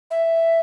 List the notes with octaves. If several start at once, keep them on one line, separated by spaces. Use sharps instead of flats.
E5